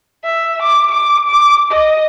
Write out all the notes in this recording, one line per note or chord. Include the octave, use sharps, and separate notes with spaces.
E5
D6
D6
D6
D#5